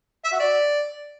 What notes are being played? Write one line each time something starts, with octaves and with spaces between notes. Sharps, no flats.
E5
F#4
D5